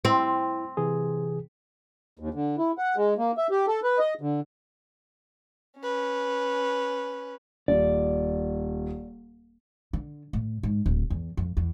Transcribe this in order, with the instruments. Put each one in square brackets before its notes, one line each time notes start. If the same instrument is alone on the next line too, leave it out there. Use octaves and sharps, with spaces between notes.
[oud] C4 [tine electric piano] E4
[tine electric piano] C3 E3 G#4
[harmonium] D#2
D3
E4
F#5
G#3
A#3
E5
G4
A4
B4
D#5
D3
[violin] C#4 B4
[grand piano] D#1 [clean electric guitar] D5
[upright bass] D3
A2
G#2
D1
E2
F2
E2